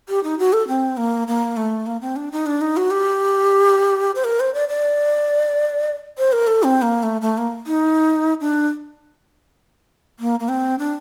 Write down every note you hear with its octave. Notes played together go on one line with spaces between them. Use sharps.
G4
D#4
F#4
A4
C4
A#3
A#3
A3
A#3
C4
D4
D#4
D4
D#4
F#4
G4
C5
A#4
C5
D5
D5
C5
A#4
A4
C4
A#3
A3
A3
A#3
D#4
D4
A#3
A#3
C4
D4